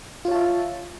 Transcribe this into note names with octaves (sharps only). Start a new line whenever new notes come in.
F4 C#5 E5 A5